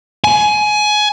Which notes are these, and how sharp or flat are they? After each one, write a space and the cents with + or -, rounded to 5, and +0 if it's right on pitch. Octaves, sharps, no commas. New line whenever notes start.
G#5 +20